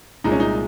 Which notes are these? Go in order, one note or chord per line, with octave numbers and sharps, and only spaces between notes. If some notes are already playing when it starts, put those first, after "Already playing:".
C2 A#2 G#3 D#4
C#4
D#4